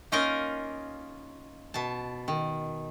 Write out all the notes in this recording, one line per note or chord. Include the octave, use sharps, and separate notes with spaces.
A#3 C#4 D#4 F4 A#4 D#5
B2 A5
D#3